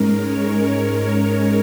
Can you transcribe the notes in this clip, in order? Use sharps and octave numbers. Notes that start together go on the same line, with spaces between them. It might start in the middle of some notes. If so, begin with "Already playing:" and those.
Already playing: G#2 G#3 C#4 A#4
C#5
A#4